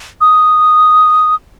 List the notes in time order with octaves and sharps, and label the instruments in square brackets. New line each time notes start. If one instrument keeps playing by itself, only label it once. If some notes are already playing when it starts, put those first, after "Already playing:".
[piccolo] D#6